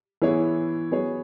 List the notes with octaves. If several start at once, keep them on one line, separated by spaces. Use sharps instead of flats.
E3 B3 E4 G#4 C#5
F#3 B3 G#4 C#5